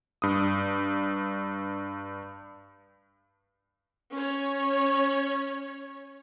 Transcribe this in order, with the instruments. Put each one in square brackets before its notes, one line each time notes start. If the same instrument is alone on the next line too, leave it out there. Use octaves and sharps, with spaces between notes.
[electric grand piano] G2 D#6
[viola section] C#4 C#5